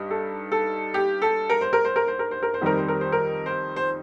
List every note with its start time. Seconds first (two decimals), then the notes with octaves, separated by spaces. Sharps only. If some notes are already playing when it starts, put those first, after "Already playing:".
Already playing: G2 D#4
0.10 A4
0.52 A4
0.94 G4
1.22 A4
1.49 A#4
1.61 C5
1.73 A#4
1.85 C5
1.96 A#4
2.08 C5
2.19 A#4
2.31 C5
2.42 A#4
2.54 C5
2.61 F2 D#3 G3 C4 D#4 A#4
2.78 C5
2.88 A#4
3.01 C5
3.12 A#4
3.46 C5
3.76 C5